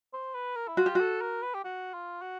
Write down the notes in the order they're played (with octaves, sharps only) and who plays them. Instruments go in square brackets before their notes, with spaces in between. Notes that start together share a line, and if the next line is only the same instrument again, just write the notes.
[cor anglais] C5
B4
A#4
E4
[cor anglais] F4 [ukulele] F#4
[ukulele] G4
[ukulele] F#4 [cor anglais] A4
[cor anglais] A#4
B4
G4
F#4
F4
F#4